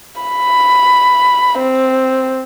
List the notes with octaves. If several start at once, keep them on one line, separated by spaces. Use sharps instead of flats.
B5
C4